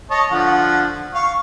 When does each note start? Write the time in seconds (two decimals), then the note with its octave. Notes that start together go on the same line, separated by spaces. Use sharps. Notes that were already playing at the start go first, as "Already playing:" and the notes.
0.10 C#5 D#5 A5
0.31 D3 F3 F#5
1.14 F5 C#6